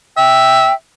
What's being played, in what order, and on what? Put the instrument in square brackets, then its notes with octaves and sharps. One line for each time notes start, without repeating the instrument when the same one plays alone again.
[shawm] E5 [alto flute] G5